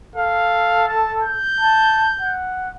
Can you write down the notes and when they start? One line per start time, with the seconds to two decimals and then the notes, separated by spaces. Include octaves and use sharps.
0.16 A4 F5
0.88 A5
1.23 G6
1.61 A5
2.21 F#5